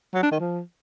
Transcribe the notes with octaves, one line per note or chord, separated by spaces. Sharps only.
F#3
D4
D#3
F3